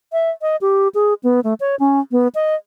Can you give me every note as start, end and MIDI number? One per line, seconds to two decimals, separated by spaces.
0.13 0.30 76
0.42 0.56 75
0.61 0.88 67
0.95 1.14 68
1.23 1.40 59
1.44 1.54 57
1.60 1.76 73
1.80 2.00 61
2.12 2.28 59
2.35 2.55 75